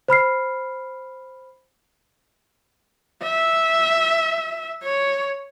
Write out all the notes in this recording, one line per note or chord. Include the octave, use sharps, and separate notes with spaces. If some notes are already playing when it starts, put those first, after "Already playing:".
C5 B5 F6 C7
E5
C#5